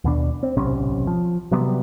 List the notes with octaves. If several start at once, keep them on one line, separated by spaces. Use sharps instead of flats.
D#2 B2 D4
C4
D1 B1 C3 C#4
F3
C3 F#3 G3 B3